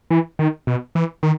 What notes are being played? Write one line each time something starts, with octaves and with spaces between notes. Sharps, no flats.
E3
D#3
B2
E3
D#3